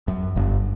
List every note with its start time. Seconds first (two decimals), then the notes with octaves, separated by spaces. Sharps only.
0.08 F#2
0.36 G1 G2